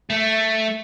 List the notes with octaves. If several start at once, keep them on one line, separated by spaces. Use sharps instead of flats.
A3